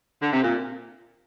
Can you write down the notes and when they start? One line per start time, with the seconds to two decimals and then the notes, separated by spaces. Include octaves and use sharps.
0.22 D3
0.33 C3
0.44 A#2